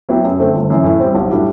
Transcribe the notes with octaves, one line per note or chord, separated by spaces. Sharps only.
F#3 B3 E4 G4
F#2
D3 A3 C4
G1
F#2 E3
A2
G3 C4
B1
A2 G3 D4 F#4